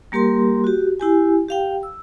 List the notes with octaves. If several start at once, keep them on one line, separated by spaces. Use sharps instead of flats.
G3 A#3 G4 A#4 C6
F#4 G4
E4 G4 G#5
G4 F5 G5
E6